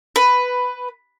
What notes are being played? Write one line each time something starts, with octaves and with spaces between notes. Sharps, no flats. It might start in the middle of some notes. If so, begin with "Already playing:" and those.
B4